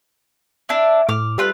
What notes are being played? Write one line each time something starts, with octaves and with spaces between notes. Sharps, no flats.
D4 E4
A2 D6 F6
G3 A3 F4 B4